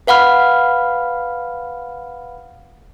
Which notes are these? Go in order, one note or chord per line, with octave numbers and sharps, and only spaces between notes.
B4 F5 F#5 B5 F6